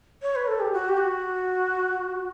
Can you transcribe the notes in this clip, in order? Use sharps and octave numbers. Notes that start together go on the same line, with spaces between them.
C#5
B4
A4
G4
F#4
G4
F#4